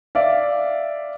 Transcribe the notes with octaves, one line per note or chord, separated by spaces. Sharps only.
D5 E5 F5